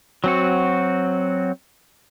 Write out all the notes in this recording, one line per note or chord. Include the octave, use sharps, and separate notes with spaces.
F#3 C4 F#4